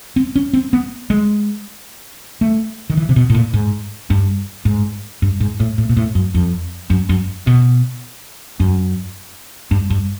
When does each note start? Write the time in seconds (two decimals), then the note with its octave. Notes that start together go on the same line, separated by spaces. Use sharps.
0.16 C4
0.36 C#4
0.53 C4
0.73 B3
1.10 G#3
2.41 A3
2.90 D#3
2.97 E3
3.09 C3
3.16 B2
3.30 A2
3.34 A#2
3.54 G#2
4.10 G2
4.65 G#2
5.22 G2
5.40 G#2
5.60 A2
5.78 A2
5.89 A#2
5.97 A2
6.15 F#2
6.35 F2
6.90 F#2
7.09 F#2
7.47 B2
8.60 F#2
9.71 G2
9.90 G2